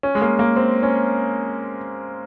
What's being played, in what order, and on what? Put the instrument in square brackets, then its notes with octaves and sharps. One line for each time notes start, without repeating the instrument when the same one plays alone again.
[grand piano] C#4
G#3
A#3
A#3
C4
C#4